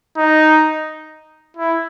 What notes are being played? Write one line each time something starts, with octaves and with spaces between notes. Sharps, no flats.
D#4
E4